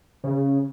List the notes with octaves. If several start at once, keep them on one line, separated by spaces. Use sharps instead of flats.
C#3